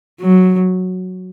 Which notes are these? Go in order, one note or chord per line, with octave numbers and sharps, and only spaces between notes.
F#3